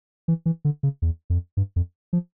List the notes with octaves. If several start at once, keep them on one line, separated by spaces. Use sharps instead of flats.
E3
E3
D3
C#3
E2
F2
G2
F2
F3